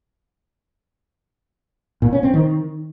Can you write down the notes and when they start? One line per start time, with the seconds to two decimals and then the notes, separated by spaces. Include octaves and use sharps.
2.02 A#2
2.13 C#4
2.23 C4
2.34 D#3